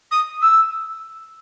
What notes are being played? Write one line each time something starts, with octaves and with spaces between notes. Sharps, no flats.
D#6
E6